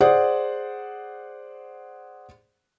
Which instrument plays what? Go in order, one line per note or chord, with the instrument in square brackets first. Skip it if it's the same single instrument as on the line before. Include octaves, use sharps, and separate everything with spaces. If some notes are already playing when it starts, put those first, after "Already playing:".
[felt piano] G#4 C5 D5 F#5